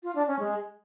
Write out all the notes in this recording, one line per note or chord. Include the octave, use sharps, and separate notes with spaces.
F4
D4
C#4
G#3